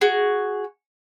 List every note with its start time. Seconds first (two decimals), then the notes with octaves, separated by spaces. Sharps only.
0.01 F#4 G#4